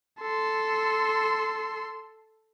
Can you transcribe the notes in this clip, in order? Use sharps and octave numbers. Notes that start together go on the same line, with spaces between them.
A4 C6